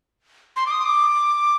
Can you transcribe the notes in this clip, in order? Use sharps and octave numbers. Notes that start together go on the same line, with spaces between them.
C6
D6
D#6
D6